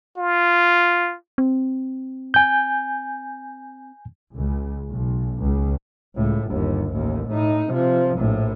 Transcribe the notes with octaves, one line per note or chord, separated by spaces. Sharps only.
F4
C4
G#5 G6
C#2
B1
C#2
C#2 A2
G1 D#2
A1 D#2
A2 D#4
C3 F3
A#1 A2